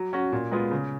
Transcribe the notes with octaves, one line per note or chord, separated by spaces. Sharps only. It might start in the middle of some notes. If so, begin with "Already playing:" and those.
Already playing: F#3
C#4 F#4
A#2
G#3 B3 F4
C#3